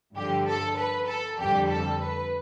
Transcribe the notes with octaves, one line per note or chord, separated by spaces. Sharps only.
G2 D3 F3 G4
A4
B4
A4
F2 D3 G3 G4
A4
B4